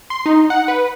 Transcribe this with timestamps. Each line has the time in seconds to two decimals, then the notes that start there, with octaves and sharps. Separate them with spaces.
0.10 C6
0.26 D#4
0.50 F#5
0.68 B4